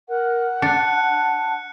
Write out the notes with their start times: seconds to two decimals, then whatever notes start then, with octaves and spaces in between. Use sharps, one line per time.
0.09 A#4 F#5
0.62 D4 A5 F#6 C#7